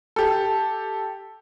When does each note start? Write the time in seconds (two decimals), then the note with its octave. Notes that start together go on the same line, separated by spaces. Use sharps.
0.16 G4 A4